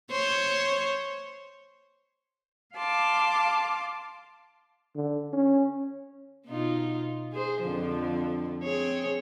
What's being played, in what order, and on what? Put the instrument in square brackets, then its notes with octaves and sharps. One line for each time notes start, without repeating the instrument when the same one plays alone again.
[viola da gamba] C5 C#5
[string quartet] F5 A5 C6 D6
[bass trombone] D3
C#4
[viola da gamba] B2 D#4 F4
G#4 C5
F2 D3 F3
C4 G#4 C#5